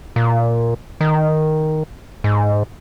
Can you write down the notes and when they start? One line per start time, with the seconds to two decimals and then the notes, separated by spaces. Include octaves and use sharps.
0.16 A#2
1.01 D#3
2.24 G#2